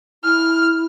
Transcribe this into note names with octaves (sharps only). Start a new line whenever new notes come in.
E4 F6